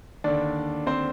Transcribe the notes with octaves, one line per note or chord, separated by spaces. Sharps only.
D#2 D3 D4 D5
C4 C5